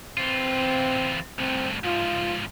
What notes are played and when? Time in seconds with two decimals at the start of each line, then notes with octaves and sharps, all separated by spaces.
0.18 E3 C4 F4
1.39 C2 A2 C4
1.84 G#2 F3 F4